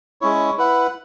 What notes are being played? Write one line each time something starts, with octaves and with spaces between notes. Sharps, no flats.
G#3 C#4 E4 C#5
E4 B4 F#5